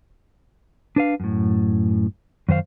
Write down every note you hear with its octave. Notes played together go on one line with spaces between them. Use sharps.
D4 B4 F5
F#2 A2
F#2 D#3 C5 F5